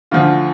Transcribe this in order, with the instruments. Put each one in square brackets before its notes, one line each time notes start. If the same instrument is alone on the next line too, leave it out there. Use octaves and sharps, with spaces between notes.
[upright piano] D2 D3 F3 F4